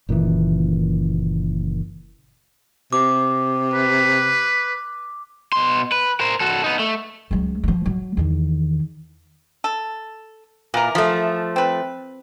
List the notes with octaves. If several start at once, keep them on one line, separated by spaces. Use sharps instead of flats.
F#1 A#2 D#3 E3
C3 D6
B4
B2 C6
B4
A#4 C5
F#4 A4
B3 D#4
A3
C#2 F#3
F3 F#3
F#3
E2 D#3
A4
A#2 E3 A#4
F3 A3
C4 B4